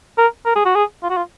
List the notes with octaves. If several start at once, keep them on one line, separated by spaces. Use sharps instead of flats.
A#4
A#4
G#4
F#4
G#4
F4
F#4
F4